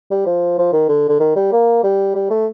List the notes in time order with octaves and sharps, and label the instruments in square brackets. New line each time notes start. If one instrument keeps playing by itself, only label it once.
[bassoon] G3
F3
F3
D#3
D3
D3
D#3
G3
A#3
G3
G3
A3